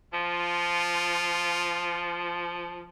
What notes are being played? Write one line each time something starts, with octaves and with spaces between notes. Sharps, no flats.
F3 F4